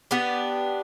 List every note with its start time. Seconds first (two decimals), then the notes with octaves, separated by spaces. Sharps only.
0.11 B3 D4 G4